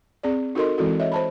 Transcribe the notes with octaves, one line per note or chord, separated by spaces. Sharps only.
C4 G#4 D5
D#4 F#4 A4 A#4 D#5 C6
E3 G#3 C4 E4 F#4 A4
C#5 D#5 E5
C5 A5 B5